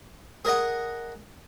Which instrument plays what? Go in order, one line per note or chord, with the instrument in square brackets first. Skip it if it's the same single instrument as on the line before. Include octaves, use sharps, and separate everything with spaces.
[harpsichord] G#4 A#4 D#5 F#5